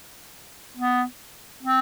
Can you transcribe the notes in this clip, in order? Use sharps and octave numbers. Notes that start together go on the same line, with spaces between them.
B3
C4